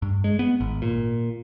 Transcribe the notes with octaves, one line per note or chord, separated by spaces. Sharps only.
G2
G#3
B3
G#1
A#2